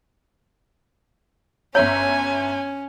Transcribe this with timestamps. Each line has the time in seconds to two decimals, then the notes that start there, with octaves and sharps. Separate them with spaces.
1.75 G1 C#4 C#5 E5 G#5 A#5